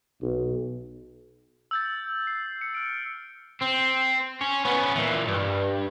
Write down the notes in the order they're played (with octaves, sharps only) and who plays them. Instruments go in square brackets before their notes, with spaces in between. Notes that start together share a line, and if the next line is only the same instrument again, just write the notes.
[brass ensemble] B1
[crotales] E6 G6 A6
C7
C#7
F6 D7
[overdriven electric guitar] C4
C#4
B3 C#4
A#2 E3
C2 G2